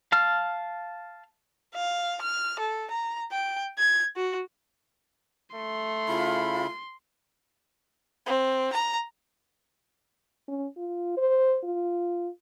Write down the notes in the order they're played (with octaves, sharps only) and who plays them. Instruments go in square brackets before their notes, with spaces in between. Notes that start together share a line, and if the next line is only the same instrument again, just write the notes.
[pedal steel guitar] F5 A5 F6
[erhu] F5
F6
A4
A#5
G5
G#6
F#4
[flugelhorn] A3 [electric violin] C6
[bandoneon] C#3 E4 B5 [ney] F4
[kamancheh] C4
A#5
[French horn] C#4
F4
C5
F4